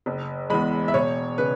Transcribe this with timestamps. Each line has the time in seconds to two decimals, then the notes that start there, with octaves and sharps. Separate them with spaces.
0.06 F#1
0.50 E2 E3 G#3 B5
0.88 E5
0.94 E1 C#5
1.38 C#3 B4